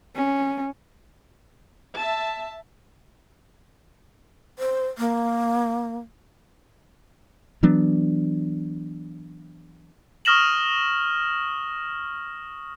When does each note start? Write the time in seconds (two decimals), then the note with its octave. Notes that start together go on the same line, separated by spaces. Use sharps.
0.16 C#4
1.97 E5 A5
4.59 C5
4.98 A#3
7.63 E3 F#3 B3 D4
10.25 C#6 D#6 F6 A#6 E7 F#7